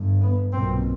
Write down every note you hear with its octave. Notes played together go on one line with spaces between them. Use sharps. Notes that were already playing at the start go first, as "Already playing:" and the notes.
Already playing: G1 G2
B3
B1 A#2 C4